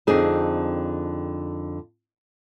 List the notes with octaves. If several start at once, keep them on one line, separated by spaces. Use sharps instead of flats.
F2 D3 C4 D#4 G#4 A5